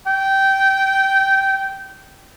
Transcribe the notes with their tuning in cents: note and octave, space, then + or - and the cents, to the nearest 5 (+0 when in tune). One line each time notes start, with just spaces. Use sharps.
G5 -15